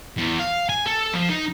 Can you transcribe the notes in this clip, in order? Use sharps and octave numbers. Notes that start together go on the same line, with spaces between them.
E2
F5
G#5
A4
F3
D#4